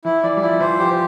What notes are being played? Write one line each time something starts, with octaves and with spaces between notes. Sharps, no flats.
E3 E4
E3 D5
G3
F3 E4
E3 C5
F3 G4